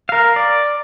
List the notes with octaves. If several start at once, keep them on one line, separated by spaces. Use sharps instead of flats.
A#4 F5
D5